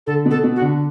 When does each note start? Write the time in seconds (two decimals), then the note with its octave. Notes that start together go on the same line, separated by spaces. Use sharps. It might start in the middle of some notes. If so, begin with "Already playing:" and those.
0.07 D3 A4
0.26 B2
0.31 A4
0.44 B2
0.56 F#4
0.61 D3